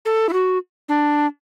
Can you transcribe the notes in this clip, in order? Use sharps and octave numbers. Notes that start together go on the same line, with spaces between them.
A4
E4
F#4
D4